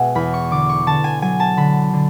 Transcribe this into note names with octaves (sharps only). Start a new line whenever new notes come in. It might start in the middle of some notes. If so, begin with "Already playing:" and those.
Already playing: B2 G#3 E5 F#5 G#5
E2 B5
C#6
D3 D6
C#6
D3 A5
G#5
F#3 G#5
A5
D3 B5
D3